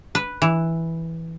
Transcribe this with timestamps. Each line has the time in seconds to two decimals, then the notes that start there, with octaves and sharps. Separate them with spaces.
0.15 B4
0.42 E3